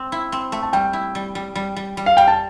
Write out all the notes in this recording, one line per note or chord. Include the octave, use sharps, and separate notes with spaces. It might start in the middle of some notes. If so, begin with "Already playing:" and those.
Already playing: C4
E4
C4
A3
A5
G3 G5
E4
G3
G3
G3
G3
G3
F5
G3 G5
A5